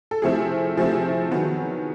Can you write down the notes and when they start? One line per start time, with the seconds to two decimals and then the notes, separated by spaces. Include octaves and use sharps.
0.11 A4
0.22 C3 F3 A3 C4 E4 G#4
0.77 C3 F3 A3 C4 E4 G#4
1.31 D#3 F#3 B3